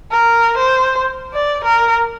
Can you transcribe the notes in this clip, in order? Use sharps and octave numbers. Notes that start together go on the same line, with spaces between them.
A#4
C5
D5
A#4